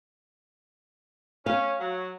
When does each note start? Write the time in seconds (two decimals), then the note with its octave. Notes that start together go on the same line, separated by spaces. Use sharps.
1.46 C#4 F5
1.80 F#3